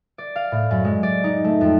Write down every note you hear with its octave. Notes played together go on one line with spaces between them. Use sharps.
D5
F5
A2
F#2
G#3
D5
D#4
A3
F2